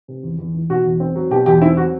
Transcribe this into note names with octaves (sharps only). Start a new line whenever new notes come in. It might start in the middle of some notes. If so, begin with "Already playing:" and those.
C3
E2
E2
E3
B2 F#4
E2
C4
F#3
B2 G4
E2 G4
C4 E4
F#3 F#4